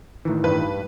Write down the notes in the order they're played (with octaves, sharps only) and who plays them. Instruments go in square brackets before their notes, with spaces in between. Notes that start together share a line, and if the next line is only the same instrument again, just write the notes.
[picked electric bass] A2 D#3 E3
[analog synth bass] G2 [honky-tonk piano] B4